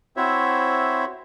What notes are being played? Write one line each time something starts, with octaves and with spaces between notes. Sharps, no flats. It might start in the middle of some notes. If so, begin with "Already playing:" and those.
C4 E4 F#4 C5 C#5 E5